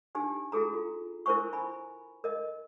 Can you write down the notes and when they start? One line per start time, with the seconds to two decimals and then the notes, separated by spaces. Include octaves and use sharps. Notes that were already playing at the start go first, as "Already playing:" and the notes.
0.15 D4 D#4 G4 G#5
0.52 E4 F#4 G#4 A4 A#5
0.74 F4
1.26 E4 A#4 C5 G#5 C#6
1.53 E4 G#5 B5
2.24 A#4 D#5